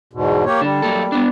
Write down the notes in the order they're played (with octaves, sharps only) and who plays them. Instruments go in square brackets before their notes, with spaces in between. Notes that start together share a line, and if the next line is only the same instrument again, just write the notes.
[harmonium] E2 G#2 B2
A#3 G4 C#5
[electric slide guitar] D3 D4 [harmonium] G3
[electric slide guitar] F#3 A#3 A4
B3 D4